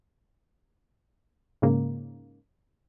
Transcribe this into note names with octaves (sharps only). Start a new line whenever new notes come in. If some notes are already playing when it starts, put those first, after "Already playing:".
G#2 C#3 A#3